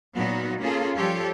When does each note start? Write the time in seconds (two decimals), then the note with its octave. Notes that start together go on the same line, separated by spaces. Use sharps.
0.14 A#2 F#3 B3 D#4 F#4
0.60 A#3 C#4 F4 G#4 A4
0.96 F3 G3 F4 G4 A4 C#5